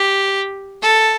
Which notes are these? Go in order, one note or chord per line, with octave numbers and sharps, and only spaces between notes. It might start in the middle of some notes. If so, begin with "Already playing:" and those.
Already playing: G4
A4